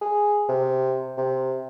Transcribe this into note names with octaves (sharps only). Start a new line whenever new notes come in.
G#4
C3
C3